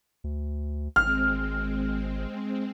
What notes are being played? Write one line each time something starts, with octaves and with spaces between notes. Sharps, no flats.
D2
G#1 G#3 C4 F6